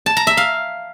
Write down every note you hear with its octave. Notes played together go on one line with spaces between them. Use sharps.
A5
A#5
E5
F5